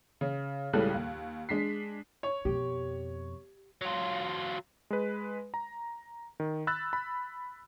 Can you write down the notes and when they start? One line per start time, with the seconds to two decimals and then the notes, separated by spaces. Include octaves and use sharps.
0.21 C#3
0.73 C#2 A2 C#3 G3 A4 F#6
0.94 D#2
1.49 G#3 D4 B6 C7
2.23 C#5
2.45 F2 B2 G4
3.82 F#3 F4
4.90 G#3 B4
5.54 A#5
6.40 D#3
6.67 B5 E6 F#6 A6
6.93 B5